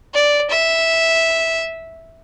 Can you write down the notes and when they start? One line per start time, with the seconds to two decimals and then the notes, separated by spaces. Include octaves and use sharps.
0.14 D5
0.50 E5